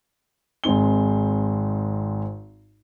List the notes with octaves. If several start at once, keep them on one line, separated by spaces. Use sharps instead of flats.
G#1 G#3 C4 D#4 G7